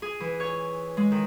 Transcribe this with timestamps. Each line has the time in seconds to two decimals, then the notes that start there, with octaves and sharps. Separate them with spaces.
0.02 G#4
0.20 E3
0.40 C#5
0.97 G#3
1.12 D#3